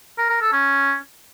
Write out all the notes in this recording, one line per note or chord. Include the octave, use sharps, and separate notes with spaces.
A#4
A#4
A4
C#4